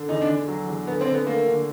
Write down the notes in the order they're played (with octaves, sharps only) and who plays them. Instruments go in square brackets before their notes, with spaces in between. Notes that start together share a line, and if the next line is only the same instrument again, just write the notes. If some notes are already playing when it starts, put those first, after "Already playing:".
Already playing: [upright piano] D3
[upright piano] E2 [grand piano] D#4
[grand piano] D4
[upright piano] E2
F#3
E2
[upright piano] D3 [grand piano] B3
[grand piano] C4
[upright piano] D3
[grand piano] B3
[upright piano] A3 [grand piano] A#3
[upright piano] D3